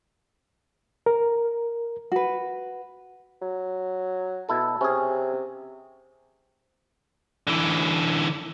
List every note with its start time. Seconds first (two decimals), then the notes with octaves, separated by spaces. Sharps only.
1.06 A#4
2.12 F#4 B4
3.42 F#3
4.49 B2 E4 A4
4.81 C3 C#4 G#4
7.47 D3 E3